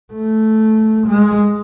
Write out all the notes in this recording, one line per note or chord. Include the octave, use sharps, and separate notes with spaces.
A3
G#3